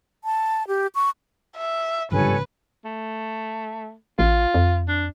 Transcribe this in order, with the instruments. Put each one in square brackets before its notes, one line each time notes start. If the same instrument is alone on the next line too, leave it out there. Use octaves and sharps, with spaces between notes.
[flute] A5
G4
C#6
[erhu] E5
[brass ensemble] G1 [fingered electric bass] G#2 C#3 F3 [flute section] A4 C#5 G#5 [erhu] B4
[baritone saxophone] A3
[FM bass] A1 [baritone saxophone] F4
[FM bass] F2
[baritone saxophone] D4